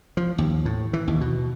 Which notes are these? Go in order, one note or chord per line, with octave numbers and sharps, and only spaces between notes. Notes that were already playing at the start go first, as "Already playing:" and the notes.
F3
D#2
A2
E3
D#2
B2